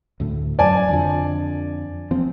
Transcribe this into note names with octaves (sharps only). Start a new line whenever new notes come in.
D2 A2
F#2 D5 G#5 A5
F2 D3 F3
F3 C4